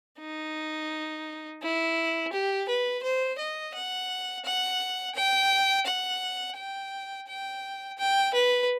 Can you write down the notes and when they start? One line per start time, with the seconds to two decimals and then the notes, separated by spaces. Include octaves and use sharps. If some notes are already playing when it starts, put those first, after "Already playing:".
0.20 D#4
1.63 E4
2.32 G4
2.68 B4
3.03 C5
3.39 D#5
3.75 F#5
4.45 F#5
5.15 G5
5.86 F#5
6.57 G5
7.28 G5
7.98 G5
8.34 B4